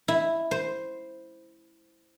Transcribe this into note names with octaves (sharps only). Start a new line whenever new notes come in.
E4
C5